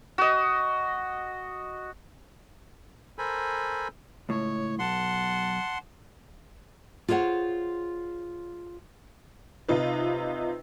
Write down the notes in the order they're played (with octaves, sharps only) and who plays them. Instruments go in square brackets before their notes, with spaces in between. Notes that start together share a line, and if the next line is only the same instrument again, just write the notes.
[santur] F#4 D#5
[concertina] A4 A#4 C5 G#5 B5
[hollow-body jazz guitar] C#2 A2 [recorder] C#5
[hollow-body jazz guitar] B1 [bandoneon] F#5 C6 [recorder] A5
[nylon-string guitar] F4 G#4 C5 C#5 F#5
[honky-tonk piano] C3 D#4 F4 B4